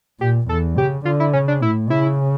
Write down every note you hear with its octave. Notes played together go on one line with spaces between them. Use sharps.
A#2 G4
E2 A4
C#3 G4
D3 F4
E4
C#3 C#4
D4
A2 E4
C#3 E4